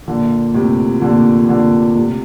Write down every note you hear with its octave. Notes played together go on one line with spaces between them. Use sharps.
A#2 D3
A2 C3
A#2 D3
A#2 D3
A2 C3